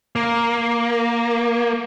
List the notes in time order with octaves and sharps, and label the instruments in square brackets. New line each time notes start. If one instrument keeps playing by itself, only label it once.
[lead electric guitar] A#3